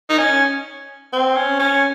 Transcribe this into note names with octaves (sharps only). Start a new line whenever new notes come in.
D#4
C#4
C4
C#4
C#4